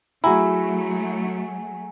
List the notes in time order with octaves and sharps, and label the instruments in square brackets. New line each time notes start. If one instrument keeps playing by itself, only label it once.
[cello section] F#3 A3 [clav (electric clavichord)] E4 [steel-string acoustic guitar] F#4 G#5 [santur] G#4 F#5 A#5